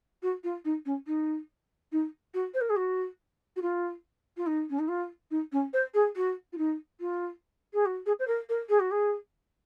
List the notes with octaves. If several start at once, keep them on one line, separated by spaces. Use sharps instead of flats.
F#4
F4
D#4
C#4
D#4
D#4
F#4
C5
A#4
G#4
F#4
F#4
F4
F4
D#4
C#4
D#4
F4
D#4
C#4
C5
G#4
F#4
F4
D#4
F4
G#4
F#4
G#4
C5
A#4
A#4
G#4
F#4
G#4